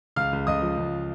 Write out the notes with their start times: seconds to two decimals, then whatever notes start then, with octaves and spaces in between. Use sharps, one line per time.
0.16 C#2 F5 F6
0.33 C#2
0.47 C#2 D#5 D#6
0.62 F3
0.77 C#2